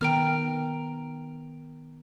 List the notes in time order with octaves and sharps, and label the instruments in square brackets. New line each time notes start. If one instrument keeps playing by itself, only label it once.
[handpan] D#3 B3 A#4 [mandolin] G5 A#5 F6